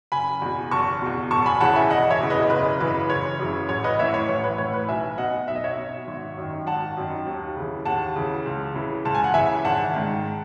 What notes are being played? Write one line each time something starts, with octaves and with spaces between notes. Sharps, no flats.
F#1 G#5 B5
E2 B2
F#1 A5 C#6
E2 B2
E1 A5 C#6
G#5 B5
E2 C#3 E3 F#5 A5
E5 G#5
E1 D#5 F#5
C#5 E5
E2 C#3 E3
B4 D#5
F#1 B4 D#5
F#2 C#3 E3 B4
F#1 C#5
F#2 C#3 E3
A1 C#5
B4 D#5
A2 E3 C#5 E5
C#5
A1 C#5
B4
A2 E3 C#5
B4
B1 E5 G#5
B2 D#5 F#5
B1 E5
D#5
C#5 E5
B2
G#1
F#2 D#3
G#1 F#5 A5
F#2 D#3
D#2
C#3 E3
D#2 F#5 A5
C#3 E3
C#2
C#3 E3
C#2 A5
G#5
F#5
C#3 E3 E5 G#5
G#1 F#5 A5
G#2 D#3